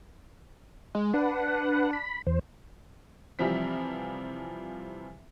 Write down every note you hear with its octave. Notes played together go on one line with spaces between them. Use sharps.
G#3
D4 B4 F#5
B5
E2 C5
C3 E3 F3 G3 C4 B6